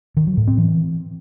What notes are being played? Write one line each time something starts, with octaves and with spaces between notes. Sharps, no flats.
D#3
F#3
A2
C4
E3